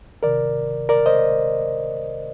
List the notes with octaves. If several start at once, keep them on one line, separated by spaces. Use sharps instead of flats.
C3 D#3 A#4 D5
A#4 D5
C5 D#5